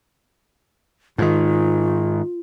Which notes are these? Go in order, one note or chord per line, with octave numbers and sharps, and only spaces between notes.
G#2 D#3 F4